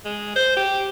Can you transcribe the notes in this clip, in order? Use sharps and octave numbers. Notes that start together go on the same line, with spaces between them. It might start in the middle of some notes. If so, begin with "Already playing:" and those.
G#3
C5
G4